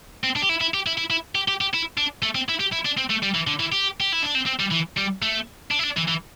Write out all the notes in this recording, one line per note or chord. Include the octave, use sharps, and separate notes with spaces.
C4
D4
G4
E4
E4
G4
E4
E4
E4
G4
G4
G4
E4
D4
A3
C4
E4
G4
E4
D4
C4
A3
G3
E3
D3
E3
G4
G4
E4
D4
C4
C4
G3
E3
G3
A3
D4
E4
D4
E3
E3